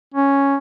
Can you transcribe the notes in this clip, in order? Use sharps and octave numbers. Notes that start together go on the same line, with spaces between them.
C#4